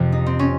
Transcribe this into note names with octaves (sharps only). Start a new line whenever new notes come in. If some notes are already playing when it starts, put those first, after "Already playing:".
Already playing: F2 C3 F3
D#4
C4
C#4